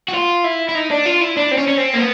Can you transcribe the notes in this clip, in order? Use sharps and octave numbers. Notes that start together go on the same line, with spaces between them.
F#4
F4
E4
E4
D#4
D4
F4
E4
D4
C4
C#4
C#4
C4
A#3
B3